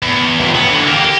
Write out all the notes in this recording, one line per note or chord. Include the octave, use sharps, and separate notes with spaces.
E2
D#2 A#2
B3
D3 E3
A#3 G4
G4